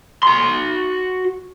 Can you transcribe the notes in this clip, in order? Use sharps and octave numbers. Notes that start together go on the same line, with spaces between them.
F#4 C6